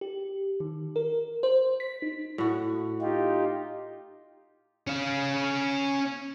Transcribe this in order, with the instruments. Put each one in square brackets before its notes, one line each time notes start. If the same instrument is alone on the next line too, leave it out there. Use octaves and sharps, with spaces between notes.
[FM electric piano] G4
D#3
A#4
C5
B6
D#4
[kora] A2 F#4
[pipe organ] D#4 F4 G4
[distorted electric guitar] C#4 F5